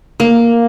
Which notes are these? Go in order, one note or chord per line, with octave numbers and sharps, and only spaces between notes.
A#3